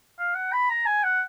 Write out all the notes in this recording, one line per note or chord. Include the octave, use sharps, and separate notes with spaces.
F5
F#5
B5
A#5
G#5
F#5